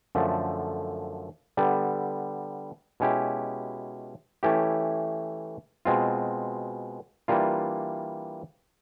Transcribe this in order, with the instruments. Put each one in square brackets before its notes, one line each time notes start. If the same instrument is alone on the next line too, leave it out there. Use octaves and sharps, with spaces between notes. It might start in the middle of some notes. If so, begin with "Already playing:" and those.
[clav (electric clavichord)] F#2 D3 F3 A3
D3 G3 B3
B2 G#3 C#4 E4 G4
E3 A3 C#4 E4 G4
B2 G#3 C4 F4
E3 G3 A#3 D4 F4